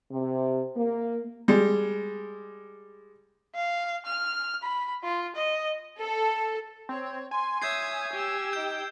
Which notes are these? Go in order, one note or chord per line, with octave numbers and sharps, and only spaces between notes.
C3
A#3
G3 G#3
F5
F6
B5
F4
D#5
A4
C4 C#5
G#5 C6
C#5 E5 D#6 G6 G#6 C7
G4 E6
D#4 G5 G6